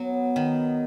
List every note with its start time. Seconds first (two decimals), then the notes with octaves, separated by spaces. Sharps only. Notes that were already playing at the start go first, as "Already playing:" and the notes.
Already playing: F#3 B3
0.36 D#3